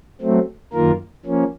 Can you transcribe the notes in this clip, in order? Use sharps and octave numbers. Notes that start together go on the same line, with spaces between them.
F#3 A3 C4
F#2 D#3 A#3 F4 A#4
F3 A#3 C#4